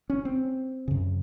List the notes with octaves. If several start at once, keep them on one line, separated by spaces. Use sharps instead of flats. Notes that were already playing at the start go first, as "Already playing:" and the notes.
C#4
C4
F#2 C#3